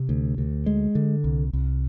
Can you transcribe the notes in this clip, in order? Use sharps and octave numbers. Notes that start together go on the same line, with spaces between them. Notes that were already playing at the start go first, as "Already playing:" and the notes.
Already playing: C3
D2
D2
G#3
D3
C2
C2